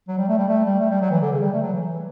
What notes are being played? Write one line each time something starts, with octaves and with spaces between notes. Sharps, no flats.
F#3
G3
A3
G3
A3
G3
A3
G3
F#3
E3
D3
C#3
G3
A3
F#3
E3